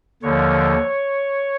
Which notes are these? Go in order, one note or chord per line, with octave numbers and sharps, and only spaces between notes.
D#2 D3 F3 C#5